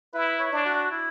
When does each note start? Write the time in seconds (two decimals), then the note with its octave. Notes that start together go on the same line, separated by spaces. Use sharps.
0.14 E4 B4
0.40 C#5
0.53 D4
0.65 F#4
0.91 E4